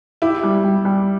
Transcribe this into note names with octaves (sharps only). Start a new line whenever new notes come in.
E4 G4
G3
G3
G3